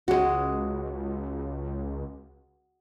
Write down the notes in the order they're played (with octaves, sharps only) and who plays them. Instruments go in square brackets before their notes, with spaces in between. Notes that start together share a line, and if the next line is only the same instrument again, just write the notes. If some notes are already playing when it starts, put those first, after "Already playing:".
[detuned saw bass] C#2 [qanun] G#3 F#4